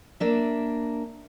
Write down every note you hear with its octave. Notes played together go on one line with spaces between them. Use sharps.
A#3 D4 E5